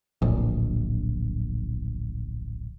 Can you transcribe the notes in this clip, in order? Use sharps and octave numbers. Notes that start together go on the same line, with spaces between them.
D1 A#1